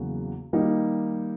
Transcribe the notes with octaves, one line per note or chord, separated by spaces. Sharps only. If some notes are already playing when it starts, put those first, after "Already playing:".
Already playing: E2 C#3 F#3 A#3
D#3 G3 A#3 D#4 G4